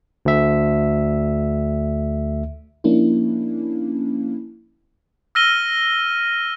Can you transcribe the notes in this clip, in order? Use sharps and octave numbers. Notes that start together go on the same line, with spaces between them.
D2 E5
F3 A#3 C#4 D4 E4
E6 F6 A#6 D#7 G7